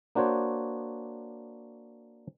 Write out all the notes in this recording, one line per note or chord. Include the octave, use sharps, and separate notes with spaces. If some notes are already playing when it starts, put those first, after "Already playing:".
A#3 D4 F#4 C5 C#5